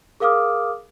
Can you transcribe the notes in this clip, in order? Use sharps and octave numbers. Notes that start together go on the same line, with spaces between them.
G#4 A#4 F5 D6 D#6 F6